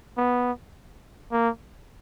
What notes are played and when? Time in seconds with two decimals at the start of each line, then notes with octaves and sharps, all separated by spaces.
0.17 B3
1.32 A#3